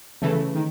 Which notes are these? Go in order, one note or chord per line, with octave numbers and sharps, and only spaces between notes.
C#3 E3 A3
D#3